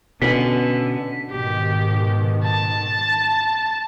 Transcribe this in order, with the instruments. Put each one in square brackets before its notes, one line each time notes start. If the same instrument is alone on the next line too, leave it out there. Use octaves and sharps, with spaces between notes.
[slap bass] B2 [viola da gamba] D3 [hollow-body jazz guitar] B3 C#4 B4 [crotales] B6
[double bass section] G#2 B2 D#3 [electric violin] G4
[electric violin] A5